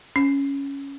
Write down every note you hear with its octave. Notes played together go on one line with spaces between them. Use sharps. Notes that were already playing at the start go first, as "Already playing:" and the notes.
C#4